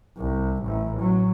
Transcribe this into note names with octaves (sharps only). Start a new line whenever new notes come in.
C2
A1
F#3